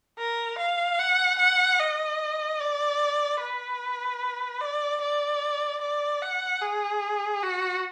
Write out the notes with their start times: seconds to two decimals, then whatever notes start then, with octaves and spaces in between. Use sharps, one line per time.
0.19 A#4
0.58 F5
0.99 F#5
1.39 F#5
1.79 D#5
2.60 D5
3.40 B4
4.61 D5
5.01 D5
5.81 D5
6.22 F#5
6.62 G#4
7.43 F#4